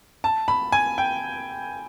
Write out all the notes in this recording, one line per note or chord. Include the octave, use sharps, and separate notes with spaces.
A5
B5
G#5
G5